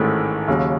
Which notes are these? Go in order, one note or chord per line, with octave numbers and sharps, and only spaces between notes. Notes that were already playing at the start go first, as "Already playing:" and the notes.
Already playing: A1 G#2 D#3 A3 E4
D#2 C#3 F#3